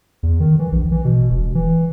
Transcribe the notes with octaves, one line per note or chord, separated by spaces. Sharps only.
E2
D#3
E3
A#1
E3
B2
E1
E3